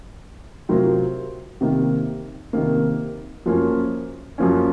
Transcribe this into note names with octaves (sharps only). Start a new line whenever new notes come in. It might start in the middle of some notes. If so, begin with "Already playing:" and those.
C3 F#3 C4 F4 A#4
C3 D#3 A#3
C3 D#3 A#3
F#2 F3 A#3 C#4
F#2 F3 A#3 C#4